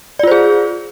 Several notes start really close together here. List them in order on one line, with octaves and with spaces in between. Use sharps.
D5 F4 C5 G#4